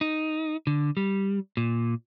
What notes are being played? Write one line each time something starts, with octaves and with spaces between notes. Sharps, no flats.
D#4
D3
G3
A#2